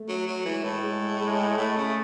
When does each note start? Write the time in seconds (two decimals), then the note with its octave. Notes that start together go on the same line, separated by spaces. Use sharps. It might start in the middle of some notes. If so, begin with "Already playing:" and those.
Already playing: A3
0.08 F#3
0.27 F#3
0.45 E3 G#3
0.64 A2
0.83 G#3
1.21 G#3
1.57 A2 A3
1.76 C#3